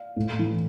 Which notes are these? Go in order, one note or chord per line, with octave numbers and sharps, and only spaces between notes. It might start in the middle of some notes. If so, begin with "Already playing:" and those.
Already playing: D5 F5
A2
E3